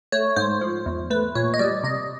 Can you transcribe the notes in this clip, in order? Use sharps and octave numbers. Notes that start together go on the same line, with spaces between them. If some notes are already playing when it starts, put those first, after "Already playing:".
A3 C#5
G#2 C5
F3
E2
A3 B4
A#2 C#5
D#5
G3 D5
C3 D#5